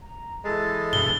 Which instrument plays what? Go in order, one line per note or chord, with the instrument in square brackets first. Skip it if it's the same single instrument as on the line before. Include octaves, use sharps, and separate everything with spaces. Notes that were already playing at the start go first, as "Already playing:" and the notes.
[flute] A#5
[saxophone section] E3 G#3 A4 [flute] A6
[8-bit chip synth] G2 B2 [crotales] G7